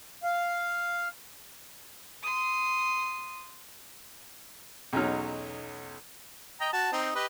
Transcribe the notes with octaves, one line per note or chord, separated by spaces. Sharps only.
F5
C6 D#6
B1 E2 F#3 C#4 D#4 F6
D#5 G5 A#5
F#4 A5
C4 D#4
G4 B4 D#5